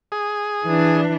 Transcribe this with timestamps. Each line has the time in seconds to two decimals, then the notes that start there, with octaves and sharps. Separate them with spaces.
0.12 G#4 D#6
0.65 E3 D4